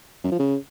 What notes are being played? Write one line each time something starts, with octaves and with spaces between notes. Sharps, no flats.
F#2
F3
C#3